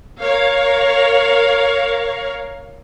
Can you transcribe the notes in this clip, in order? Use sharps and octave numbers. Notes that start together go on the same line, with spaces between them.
A#4 C#5 F5